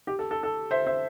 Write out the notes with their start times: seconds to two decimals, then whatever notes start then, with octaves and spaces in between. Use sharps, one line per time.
0.07 G4
0.19 A4
0.31 A4
0.43 A4
0.71 C5 E5
0.86 C5 E5